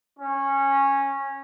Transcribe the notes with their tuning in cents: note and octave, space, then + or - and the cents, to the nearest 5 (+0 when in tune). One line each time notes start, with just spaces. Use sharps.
C#4 -15